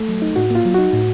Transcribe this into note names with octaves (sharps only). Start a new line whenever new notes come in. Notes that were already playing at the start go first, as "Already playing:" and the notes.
Already playing: A3 A4
F#3
D#4
A2 F#4
A#3 F4
F#3
D#4 F#4
A2